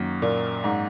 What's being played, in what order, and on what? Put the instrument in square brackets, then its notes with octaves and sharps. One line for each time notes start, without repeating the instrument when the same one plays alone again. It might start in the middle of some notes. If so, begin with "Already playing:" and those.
Already playing: [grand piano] F#2 D#3 A#3
[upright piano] A#2
G#2